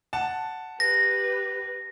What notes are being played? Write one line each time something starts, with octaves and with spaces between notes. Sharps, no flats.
F#5 A5
G4 B4 A#6